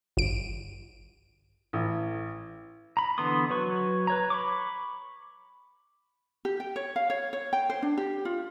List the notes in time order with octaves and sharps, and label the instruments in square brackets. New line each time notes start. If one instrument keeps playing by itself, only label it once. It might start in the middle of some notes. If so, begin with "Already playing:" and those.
[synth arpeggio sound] G1 D7
[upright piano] A1
[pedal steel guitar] A#5 B5
D3 E3 B3 C6 D#6
F#3 B4 C#6
B4 C#5 A#5
B5 C#6 D6
[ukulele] G4
G5
C#5
F5
C#5
C#5
G5
C5
D4
G4
F4